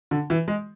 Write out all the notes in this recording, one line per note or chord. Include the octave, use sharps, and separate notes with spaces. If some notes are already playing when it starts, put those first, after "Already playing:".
D3
E3
G#3